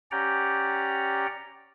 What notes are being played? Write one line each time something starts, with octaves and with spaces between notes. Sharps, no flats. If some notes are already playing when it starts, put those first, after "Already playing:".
C#4 G4 D5 F#5 G5 A#5